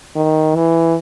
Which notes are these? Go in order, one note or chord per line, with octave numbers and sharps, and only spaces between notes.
D#3
E3